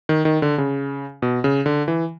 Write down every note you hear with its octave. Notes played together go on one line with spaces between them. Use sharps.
D#3
D#3
D3
C#3
B2
C#3
D3
E3